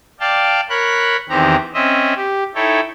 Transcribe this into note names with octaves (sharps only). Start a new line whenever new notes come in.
D5 F5 G5 A5
A#4 C#5 B5 F#6
E2 D#3 C4 G4 A#5
C4 C#4 D#5 E5
G4
D#4 E4 A4 C#5 G5